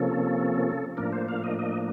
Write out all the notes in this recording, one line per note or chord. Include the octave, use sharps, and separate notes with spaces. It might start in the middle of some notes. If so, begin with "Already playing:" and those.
Already playing: C3 F3 A#3 C#4 A4
A2 F3 A#3 D4 A#4
C5
F5
D#5
D#5